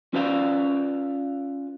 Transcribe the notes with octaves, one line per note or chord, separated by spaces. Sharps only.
C#4 F4 B4 D5 F5